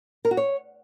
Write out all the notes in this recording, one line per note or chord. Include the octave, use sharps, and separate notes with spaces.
A#4
F#4
C#5